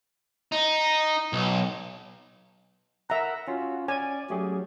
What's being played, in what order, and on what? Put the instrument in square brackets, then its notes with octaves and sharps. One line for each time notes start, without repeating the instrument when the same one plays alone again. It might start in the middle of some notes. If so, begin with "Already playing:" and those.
[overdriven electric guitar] D#4
B1
[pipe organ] A#4 F#5 [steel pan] E5 A#5
[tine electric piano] C#4 F4 F5 [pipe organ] F#4
[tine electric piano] C#4 [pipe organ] D5 [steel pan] G#5
[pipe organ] F#3 C#4 [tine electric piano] A3 G4 G#4